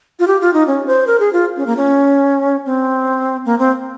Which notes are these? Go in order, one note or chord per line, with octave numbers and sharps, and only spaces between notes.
F4
G4
F4
D#4
C#4
C5
A#4
G#4
F4
C#4
A#3
C#4
C4
A#3
C4